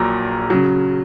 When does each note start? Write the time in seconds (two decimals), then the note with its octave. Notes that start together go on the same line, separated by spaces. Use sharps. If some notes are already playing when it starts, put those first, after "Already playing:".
Already playing: A#1 A#2 F#3 A#5
0.50 C#3 F#3